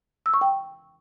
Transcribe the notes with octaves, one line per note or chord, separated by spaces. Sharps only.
E6
C#6
G5